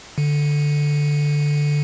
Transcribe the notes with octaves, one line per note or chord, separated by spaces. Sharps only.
D3